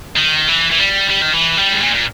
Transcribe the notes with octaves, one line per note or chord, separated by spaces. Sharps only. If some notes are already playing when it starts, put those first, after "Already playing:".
D#3
E3
E3
G3
G3
D#3
E3
G3
G#2
A#2
A#2